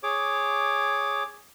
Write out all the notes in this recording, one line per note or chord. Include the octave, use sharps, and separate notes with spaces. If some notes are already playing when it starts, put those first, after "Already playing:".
G#4 C#5 D6